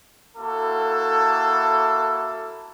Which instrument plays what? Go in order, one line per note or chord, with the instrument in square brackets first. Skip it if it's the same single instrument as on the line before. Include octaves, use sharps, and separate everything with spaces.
[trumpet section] A#3 E4 F#4 A4